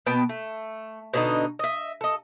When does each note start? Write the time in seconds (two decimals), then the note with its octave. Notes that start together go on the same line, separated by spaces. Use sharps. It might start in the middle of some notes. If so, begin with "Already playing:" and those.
0.06 B2 B3 G5 A5
0.29 A3
1.13 B2 D3 D#4
1.59 D#5 E5
2.01 A4 D#5